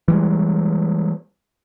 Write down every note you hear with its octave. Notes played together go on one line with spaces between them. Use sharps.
E3 G3 G#3